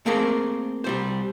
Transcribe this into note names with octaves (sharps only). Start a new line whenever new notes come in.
A3 A#3 C4 G#4 A#4
C2 G3 C5